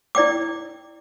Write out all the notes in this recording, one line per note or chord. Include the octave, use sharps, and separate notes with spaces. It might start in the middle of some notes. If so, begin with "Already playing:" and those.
E4 D5 G5 D6